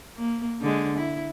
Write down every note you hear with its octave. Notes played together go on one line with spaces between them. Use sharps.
A#3
D3 G#3
E4